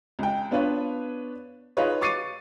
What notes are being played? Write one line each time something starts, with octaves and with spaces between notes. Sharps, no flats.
C#2 G5
B3 D4 F4 B4 C#5
D#4 F4 G#4 B4 C#5 D#5
C#6 D6 A6 C7 C#7 D#7